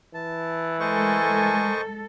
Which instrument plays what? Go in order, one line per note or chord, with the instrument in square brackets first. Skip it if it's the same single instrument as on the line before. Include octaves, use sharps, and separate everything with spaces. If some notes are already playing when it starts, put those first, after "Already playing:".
[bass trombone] E3 [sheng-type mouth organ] A5
[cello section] G#3 A4 [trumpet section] A3 A#4 G#5 [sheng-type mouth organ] C5 D#5 C#6